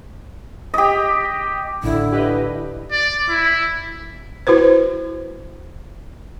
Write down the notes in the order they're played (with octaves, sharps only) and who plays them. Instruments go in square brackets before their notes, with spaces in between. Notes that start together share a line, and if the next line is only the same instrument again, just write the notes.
[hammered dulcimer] G4 D#5
[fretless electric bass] A1 [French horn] D3 [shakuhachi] E4
[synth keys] G4 B4 D#5
[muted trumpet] D5
E4
[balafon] E4 F#4 B4 C5